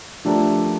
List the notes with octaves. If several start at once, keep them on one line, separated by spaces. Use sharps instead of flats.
F3 A3 D4 G4 A#4